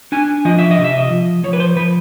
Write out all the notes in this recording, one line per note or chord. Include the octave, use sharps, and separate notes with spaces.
D4 G#5
F3 D#5
E5
D#5
C3
E5
D#5
F3
F3 C#5
B4
C5
F3 B4